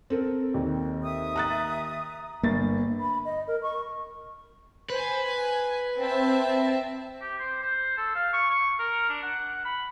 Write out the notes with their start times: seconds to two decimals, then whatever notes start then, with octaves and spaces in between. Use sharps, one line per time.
0.10 C4 A4 A#4
0.54 D#2
1.02 E5 D#6
1.36 A#5 F#6 A6
2.43 G1 A#3 A6
3.00 B5
3.25 D#5
3.47 A#4
3.62 C#6
4.90 B4 C5 G#5
5.25 G#5
5.97 C4 E5 A5
7.22 G4
7.39 C5
7.62 C5
7.97 A4
8.15 F5
8.33 C#6
8.50 C#6
8.79 A#4
9.09 D4
9.23 F#5
9.65 B5